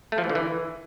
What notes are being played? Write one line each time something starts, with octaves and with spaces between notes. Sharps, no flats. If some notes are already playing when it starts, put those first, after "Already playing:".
A3
F3
E3
D3
E3